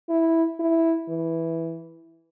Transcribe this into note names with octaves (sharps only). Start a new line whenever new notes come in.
E4
E4
E3